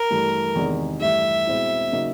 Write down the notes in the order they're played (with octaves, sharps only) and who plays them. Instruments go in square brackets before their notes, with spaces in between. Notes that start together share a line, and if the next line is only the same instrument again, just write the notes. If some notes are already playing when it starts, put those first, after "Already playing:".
Already playing: [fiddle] A#4
[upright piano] G2 E3 A3
E2 C3 D#3 G#3
[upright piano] G2 E3 A3 [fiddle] E5
[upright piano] B2 G#3 C4 E4
C#3 F#3 A#3 D#4 F#4